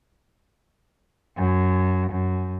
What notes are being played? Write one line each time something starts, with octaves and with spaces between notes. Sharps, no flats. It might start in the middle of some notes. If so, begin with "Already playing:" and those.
F#2
F#2